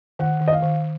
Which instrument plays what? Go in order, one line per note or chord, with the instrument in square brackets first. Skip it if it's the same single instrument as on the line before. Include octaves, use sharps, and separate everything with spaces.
[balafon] D#3 [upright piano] F#5
[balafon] D#3
[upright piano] D#5
F5
[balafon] D#3